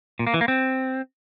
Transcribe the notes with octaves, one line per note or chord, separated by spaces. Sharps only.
A#2
A#3
E3
A#3
C4